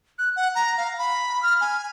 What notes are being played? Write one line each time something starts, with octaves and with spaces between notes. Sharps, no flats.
F#6
F#5
A#5
F5
B5
F6
G#5